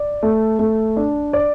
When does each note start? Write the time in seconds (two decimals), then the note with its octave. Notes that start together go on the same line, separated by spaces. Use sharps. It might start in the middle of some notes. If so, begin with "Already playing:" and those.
Already playing: D5
0.23 A3
0.59 A3
0.97 D4
1.33 D5